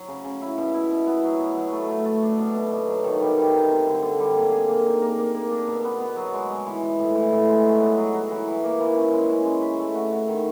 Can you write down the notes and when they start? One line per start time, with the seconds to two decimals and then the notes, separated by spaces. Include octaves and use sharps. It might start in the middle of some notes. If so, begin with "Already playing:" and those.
Already playing: F#3
0.08 C#3
0.24 C#3
0.41 E4
0.58 B2
0.74 E4
0.91 B2
1.07 B3
1.24 F#3
1.40 B2
1.56 F#3
1.72 A3
1.89 A3
2.05 A3
2.23 D4
2.39 B2
2.55 B2
2.71 B2
2.87 F#3
3.04 D#3
3.21 G3
3.37 G3
3.54 D#4
3.70 C4
3.87 D3
4.02 D3
4.19 G3
4.35 A#3
4.52 G#4
4.69 A#3
4.85 D#4
5.02 A#3
5.19 A#3
5.34 A#3
5.51 D4
5.68 B2
5.84 B3
6.00 B3
6.16 F#3
6.33 G#3
6.50 G#3
6.66 E3
6.82 E3
6.99 A2
7.15 E3
7.32 A2
7.49 G#3
7.64 F#3
7.81 B3
7.98 F#3
8.14 F#3
8.31 E3
8.47 E3
8.64 A#3
8.80 E3
8.97 C#4
9.13 G#3
9.30 C#4
9.45 G#3
9.62 B4
9.79 A3
9.95 F#4
10.11 F#4
10.28 D#3